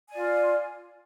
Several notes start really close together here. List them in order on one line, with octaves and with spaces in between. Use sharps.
G#5 D5 F4